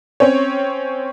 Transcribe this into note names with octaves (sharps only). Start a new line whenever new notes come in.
C4 C#4 C#5